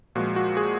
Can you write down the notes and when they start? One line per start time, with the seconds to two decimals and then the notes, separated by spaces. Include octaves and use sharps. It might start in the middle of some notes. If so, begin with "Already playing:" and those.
0.15 A#2 F3 G#3 F#4
0.36 F#4
0.57 G#4